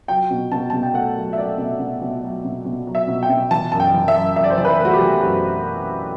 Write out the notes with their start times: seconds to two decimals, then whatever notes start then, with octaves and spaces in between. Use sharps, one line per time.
0.08 F#3 G5
0.31 B2
0.52 B2 A5
0.70 B2 A5
0.83 G5
0.94 A3 F#5
1.16 F#3
1.33 E5
1.38 A3 D5
1.58 B2
1.80 B2
2.02 B2
2.23 F#3
2.45 B2
2.65 B2
2.87 F#3
2.95 E5
3.08 B2
3.23 G5
3.30 B2
3.51 E3 A5
3.72 F#2 A5
3.80 G5
3.94 E3
4.08 E5
4.15 F#2
4.36 F#2 E5
4.44 D5
4.50 C5
4.57 E3 D5
4.65 B4
4.80 A3
4.85 F#4
4.93 G4
5.00 E3
5.22 F#2 F#4